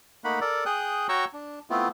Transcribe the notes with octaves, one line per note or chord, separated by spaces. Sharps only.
A3 A#3 D#4 F#5 B5
A4 A#4 D5
G#4 G5 D#6 F#6
F#4 C#5 G5 A#5 C#6 E6
D4
A3 B3 C4 E4 F4